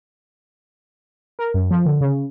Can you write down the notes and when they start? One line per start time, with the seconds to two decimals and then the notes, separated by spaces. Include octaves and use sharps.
1.39 A#4
1.54 F#2
1.71 F3
1.86 D3
2.01 C#3